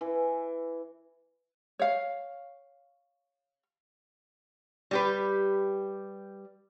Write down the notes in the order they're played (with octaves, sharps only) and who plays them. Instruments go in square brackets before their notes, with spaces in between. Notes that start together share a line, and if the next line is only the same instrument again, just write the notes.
[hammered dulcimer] E3
[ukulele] C#5 F5
[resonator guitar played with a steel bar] G3 G4 B4